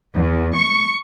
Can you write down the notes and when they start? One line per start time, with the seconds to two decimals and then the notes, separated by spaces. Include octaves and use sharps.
0.15 E2
0.56 C#6